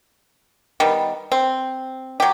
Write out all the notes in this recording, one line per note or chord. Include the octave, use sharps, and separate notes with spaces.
D#3 G3 B3
C4
F#3 G4